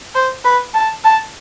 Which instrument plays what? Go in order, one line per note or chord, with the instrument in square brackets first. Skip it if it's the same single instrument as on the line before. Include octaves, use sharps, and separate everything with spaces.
[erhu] C5
B4
A5
A5